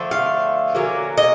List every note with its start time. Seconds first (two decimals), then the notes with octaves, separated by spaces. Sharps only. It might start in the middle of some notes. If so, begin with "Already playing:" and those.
Already playing: D3 F3 A3
0.11 F5
0.75 D3 F#3 A#3 C#4
1.17 D#5